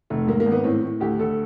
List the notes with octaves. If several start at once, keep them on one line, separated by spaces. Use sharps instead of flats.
F1 A3
G#2 A#3
A#3
G#1
B3
A2 C4
A2
D2 G4
D2 A4